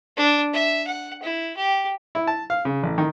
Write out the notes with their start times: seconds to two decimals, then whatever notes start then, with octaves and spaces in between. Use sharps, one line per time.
0.17 D4
0.52 E5
0.87 F#5
1.22 E4
1.56 G4
2.15 E4
2.27 A5
2.50 F5
2.65 C#3
2.83 A1
2.98 D#3